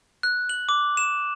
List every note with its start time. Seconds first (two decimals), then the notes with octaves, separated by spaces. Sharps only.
0.23 F#6
0.49 F#7
0.69 D6
0.97 E7